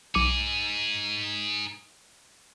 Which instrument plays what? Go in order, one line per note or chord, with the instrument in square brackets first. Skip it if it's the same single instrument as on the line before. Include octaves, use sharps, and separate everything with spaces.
[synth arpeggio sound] B1 D6 C#7 [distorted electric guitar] D#4 G#4